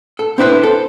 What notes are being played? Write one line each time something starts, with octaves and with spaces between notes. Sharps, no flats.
A4
C4 D4 E4 B4 C5
A4 C5